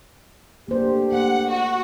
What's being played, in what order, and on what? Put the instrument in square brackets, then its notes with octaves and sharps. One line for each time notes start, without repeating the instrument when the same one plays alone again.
[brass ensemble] A3 D4 G4 [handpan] A#3 C5
[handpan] A#3 [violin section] F#5
[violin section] F#4